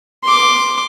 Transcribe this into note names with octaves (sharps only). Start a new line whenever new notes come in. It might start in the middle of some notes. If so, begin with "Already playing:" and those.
C6 D6